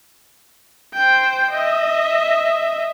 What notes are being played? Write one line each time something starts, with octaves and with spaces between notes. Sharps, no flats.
C5 G5
D#5 E5